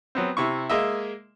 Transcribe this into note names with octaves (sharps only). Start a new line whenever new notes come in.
F#3 B3 C4
C3 E4 C#6
G#3 A#3 D#5 E5